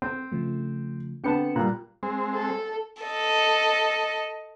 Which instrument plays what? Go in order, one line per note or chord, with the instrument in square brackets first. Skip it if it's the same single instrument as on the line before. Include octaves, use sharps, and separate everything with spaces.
[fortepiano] C4
[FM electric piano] C#3 F3 A3
[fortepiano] D3 B3 A5 [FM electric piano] C4 G5 C#7
[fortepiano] A#2 G3 [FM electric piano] A#5 F#6
[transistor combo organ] G#3 C4
[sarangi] A4
[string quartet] A4 D#5